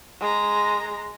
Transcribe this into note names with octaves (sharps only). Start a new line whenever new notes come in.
G#3 A#5